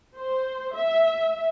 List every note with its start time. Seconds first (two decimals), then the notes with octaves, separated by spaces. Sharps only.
0.17 C5
0.75 E5